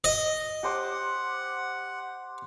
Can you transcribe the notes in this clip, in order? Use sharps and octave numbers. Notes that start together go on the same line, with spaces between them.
D#5
G4 C5 F#5 D6